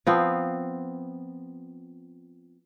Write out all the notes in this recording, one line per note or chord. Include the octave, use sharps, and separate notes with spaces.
F3 B3 C4